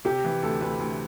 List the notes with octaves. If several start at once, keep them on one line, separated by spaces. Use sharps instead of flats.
C3 G4
E3
D2 A4
D2 B4
D2